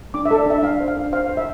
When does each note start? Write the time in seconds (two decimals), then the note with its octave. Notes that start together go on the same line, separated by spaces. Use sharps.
0.14 D4 D6
0.26 E5
0.31 A4
0.38 D5
0.46 D4 E5
0.58 E5
0.63 D4 F5
0.80 C5
0.88 F5
0.97 D4
1.12 C5 F5
1.29 C5
1.37 E5